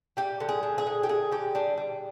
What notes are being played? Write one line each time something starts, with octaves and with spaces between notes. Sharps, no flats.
G3 G4
D3
G#4
D3
G#4
D3
G4
D3 G#4
D3 G4
G3 D4
G3